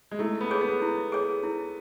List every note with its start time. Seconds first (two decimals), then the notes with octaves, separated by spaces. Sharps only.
0.11 G#3
0.19 A3 E4
0.41 B3
0.51 G#4 C#5
0.61 B3
0.82 E4
1.12 G#4 C#5
1.43 E4